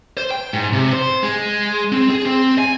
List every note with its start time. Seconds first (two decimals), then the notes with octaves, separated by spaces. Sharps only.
0.17 C5
0.31 G5
0.53 G#2
0.73 C3
0.93 C5
1.23 G#3
1.92 C4
2.09 G#4
2.25 C4
2.58 G#5